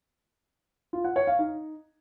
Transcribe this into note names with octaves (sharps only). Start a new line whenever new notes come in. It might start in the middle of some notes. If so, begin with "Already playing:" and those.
F4
F#5
C#5
F5
D#4